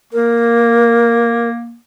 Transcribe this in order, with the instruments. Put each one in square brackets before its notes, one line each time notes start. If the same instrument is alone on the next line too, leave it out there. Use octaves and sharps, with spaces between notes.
[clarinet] A#3 [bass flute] A#4